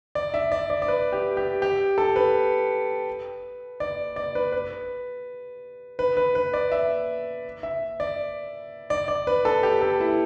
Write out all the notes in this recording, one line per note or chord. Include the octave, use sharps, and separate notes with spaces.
D5
E5
D5
D5
D5
B4
G4
G4
G4
A4
B4
D5
D5
B4
B4
B4
B4
B4
D5
E5
E5
D5
D5
D5
B4
A4
G4
A4
E4